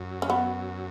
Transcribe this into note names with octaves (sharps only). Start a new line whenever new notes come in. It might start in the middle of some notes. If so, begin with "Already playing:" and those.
Already playing: F#2
C#4
B3